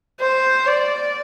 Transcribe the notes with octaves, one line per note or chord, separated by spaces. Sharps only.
C5
D5